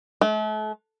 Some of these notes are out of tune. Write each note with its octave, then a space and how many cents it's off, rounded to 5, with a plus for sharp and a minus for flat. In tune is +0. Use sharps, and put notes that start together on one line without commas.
A3 -40